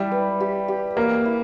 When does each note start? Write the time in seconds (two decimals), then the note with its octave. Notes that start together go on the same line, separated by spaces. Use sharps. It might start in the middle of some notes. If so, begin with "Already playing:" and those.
Already playing: G3 E4
0.12 B4
0.40 G4
0.68 G4
0.97 A#3 C#5
1.25 E4